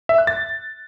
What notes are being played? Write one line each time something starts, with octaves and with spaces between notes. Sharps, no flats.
E5
F#6
A6